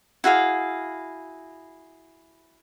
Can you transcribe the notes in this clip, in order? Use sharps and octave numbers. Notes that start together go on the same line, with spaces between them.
E4 F#4 G#4 F5